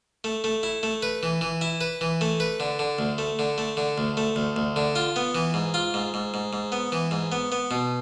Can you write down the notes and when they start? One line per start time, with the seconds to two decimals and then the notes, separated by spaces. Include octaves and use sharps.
0.24 A3
0.44 A3
0.63 E4
0.83 A3
1.02 B4
1.23 E3
1.41 E3
1.61 E4
1.81 B4
2.01 E3
2.21 A3
2.40 B4
2.60 D3
2.79 D3
2.99 D2
3.18 A3
3.39 D3
3.58 A3
3.77 D3
3.98 D2
4.17 A3
4.36 D2
4.56 D2
4.76 D3
4.96 F4
5.16 B3
5.35 E3
5.54 G#2
5.74 F4
5.94 G#2
6.14 G#2
6.34 G#2
6.53 G#2
6.72 B3
6.92 E3
7.11 G#2
7.32 B3
7.52 B3
7.71 B2